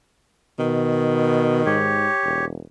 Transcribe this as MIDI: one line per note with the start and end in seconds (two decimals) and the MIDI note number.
0.59 1.62 47
0.59 2.06 51
1.66 2.08 44
1.66 2.45 67
1.66 2.45 73
2.24 2.62 28